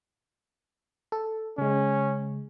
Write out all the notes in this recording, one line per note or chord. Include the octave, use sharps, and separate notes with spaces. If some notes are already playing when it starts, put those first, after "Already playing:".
A4
C#3 G#3 C#4